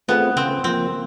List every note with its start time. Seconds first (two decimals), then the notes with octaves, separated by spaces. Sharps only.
0.08 A3 B3 C4 F4 G#4
0.36 C#3 C4
0.64 F3 A#3 C4